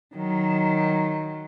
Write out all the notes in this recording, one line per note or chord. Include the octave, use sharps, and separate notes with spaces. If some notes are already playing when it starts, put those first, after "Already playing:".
D#3 F#3